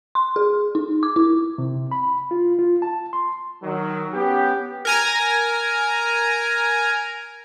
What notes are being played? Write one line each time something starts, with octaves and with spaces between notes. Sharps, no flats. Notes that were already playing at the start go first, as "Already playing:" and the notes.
C6
G#4
D#4
D6
E4
C3
B5
F4
F4
A5
C6
D#3 F#3
B3 C#4 G4
A#4 G#5 A#5